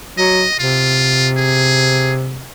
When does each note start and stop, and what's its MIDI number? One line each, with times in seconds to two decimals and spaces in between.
0.18 0.46 54
0.18 0.57 75
0.59 2.44 48
0.59 1.30 65
1.37 2.13 68